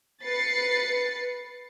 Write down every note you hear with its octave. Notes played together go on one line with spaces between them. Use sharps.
B4 A6 C7 C#7